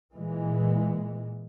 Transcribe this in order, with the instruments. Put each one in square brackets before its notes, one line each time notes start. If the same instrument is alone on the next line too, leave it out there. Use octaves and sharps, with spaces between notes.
[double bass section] A#2 E3 G#3